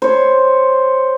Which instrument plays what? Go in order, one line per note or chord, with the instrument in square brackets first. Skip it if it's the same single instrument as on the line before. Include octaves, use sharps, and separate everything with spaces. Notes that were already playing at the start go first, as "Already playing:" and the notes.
[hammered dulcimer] C5 C#5